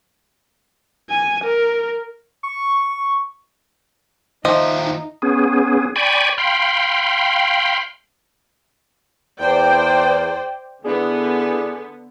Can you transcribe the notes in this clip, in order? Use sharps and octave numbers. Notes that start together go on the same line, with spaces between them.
G#5
A#4
C#6
D#2 F3 D#4 D#5 E5
B3 C#4 G#4
D5 G5 G#5 B5 C#6
F5 G5 B5 C6
E2 C5 D5 G5
D3 B3 D4 E4 G#4